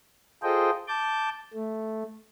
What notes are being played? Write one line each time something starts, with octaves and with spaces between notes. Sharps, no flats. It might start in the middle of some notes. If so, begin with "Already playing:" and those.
F4 G#4 A4 C5 D#5 G5
A5 D6 G6
A3